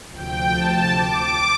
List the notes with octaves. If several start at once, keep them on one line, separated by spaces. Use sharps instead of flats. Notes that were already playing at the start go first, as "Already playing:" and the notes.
D2 C3 F3 G5
A5
D6